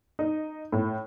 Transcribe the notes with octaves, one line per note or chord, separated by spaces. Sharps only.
D#4
A2